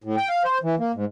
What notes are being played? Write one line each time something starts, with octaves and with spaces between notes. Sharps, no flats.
A2
G5
F5
C5
E3
A#3
G#2